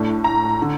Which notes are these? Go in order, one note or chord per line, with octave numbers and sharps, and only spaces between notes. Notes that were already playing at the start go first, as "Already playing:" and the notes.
Already playing: A2 A3 D4
A#5
D3